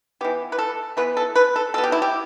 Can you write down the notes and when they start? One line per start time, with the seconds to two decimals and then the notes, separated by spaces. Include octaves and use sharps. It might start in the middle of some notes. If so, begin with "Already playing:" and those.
0.21 E3 B3 G4
0.52 B4
0.59 A4
0.97 E3 B3 B4
1.17 A4
1.36 B4
1.56 A4
1.74 B2 B3 A4
1.84 G4
1.92 E4
2.02 G4